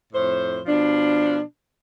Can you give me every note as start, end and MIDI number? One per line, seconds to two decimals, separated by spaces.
0.13 0.59 41
0.13 0.59 45
0.13 0.59 72
0.66 1.39 47
0.66 1.39 53
0.66 1.39 62